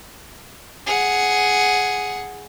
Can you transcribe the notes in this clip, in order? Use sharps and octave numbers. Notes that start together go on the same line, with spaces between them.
G#4 F#5